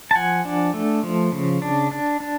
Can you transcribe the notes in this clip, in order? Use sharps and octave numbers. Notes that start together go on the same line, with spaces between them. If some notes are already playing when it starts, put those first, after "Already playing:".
A5
F3 F#5 G#5
D4
A3
F3
C#3
D4
D4
D4